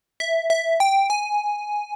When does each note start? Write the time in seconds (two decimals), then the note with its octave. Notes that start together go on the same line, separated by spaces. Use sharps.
0.20 E5
0.50 E5
0.80 G5
1.10 G#5